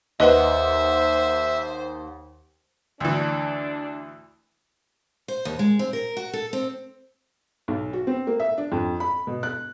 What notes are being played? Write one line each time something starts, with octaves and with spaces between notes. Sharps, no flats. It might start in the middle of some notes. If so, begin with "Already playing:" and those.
D#2 B4 C5 D#5 E5 F#5
D2 E3 D4
C5
D#2
G#3
C4
A#4
F#4
A4
C4
B1
F#4
C4
A#3
E5
D4
F2
B5
B2
F#6